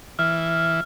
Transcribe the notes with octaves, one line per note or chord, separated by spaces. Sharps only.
E3 F6